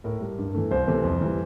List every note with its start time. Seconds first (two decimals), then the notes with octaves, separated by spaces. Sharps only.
0.04 A2 A#4
0.21 G3
0.39 G2
0.54 E3 A3
0.71 C2 C5
0.88 C3 E3 A3
1.04 F2
1.21 E3 G3